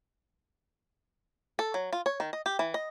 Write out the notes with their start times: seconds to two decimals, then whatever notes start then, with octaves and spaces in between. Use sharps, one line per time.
1.59 A4
1.74 F#3
1.93 F4
2.06 C#5
2.20 D#3
2.33 D#5
2.46 G4
2.59 E3
2.74 D#5